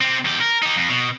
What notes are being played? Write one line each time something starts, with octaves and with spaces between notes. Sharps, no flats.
C4 G4
E2 G4
A#4
D#4 G4
F2
B2